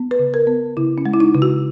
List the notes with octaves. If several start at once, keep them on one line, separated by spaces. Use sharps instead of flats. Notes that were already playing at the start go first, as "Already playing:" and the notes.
Already playing: B3
B4
C#3
A#4
B3
C#3 E4
C#4
G#3
E4
D#4
C#3
F#4